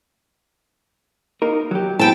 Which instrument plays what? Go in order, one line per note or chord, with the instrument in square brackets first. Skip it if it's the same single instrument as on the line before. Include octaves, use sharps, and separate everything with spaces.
[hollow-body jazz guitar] A#3 D#4 A#4
F#3 G4
[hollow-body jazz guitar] B3 E4 [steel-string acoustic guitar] G5 A5